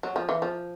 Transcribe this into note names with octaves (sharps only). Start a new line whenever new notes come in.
F#3
F3
E3
F3